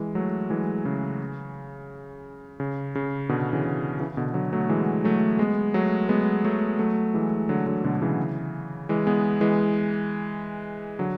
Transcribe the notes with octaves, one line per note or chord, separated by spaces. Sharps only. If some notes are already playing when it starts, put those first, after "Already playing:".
Already playing: E3 G#3
F#3 A3
E3 G#3
C#3
C#3
C#3
B2 D3
C#3 E3
C#3 E3
B2 D3
D3 F#3
F#3 A3
E3 G#3
F#3 A3
G#3 B3
F#3 A3
G#3 B3
F#3 A3
F#3 A3
E3 G#3
D3 F#3
D3 F#3
B2 D3
C#3 E3
E3 G#3
G#3 B3
E3 G#3
D3 F#3